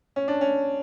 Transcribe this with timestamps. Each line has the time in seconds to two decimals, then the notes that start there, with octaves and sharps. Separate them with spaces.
0.16 C#4
0.28 D4
0.41 C#4